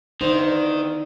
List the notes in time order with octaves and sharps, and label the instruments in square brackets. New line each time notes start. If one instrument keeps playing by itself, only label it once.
[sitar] E2 D3 [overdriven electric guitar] D#3 [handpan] D#4 [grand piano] C5